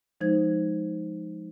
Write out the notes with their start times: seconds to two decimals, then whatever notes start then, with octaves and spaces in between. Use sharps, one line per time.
0.21 F3 G#3 D#4 C5 G#6